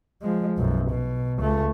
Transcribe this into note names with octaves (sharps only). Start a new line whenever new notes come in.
F3 G#3
B1 F#2
B2
C#2 A3